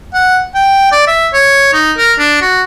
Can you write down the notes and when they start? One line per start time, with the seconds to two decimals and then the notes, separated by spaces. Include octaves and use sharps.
0.14 F#5
0.54 G5
0.92 D5
1.07 E5
1.33 C#5
1.73 D#4
1.98 A#4
2.19 D4
2.41 F#4